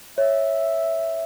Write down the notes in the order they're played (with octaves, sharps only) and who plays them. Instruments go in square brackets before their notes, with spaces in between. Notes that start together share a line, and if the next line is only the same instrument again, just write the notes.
[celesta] C#5 [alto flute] E5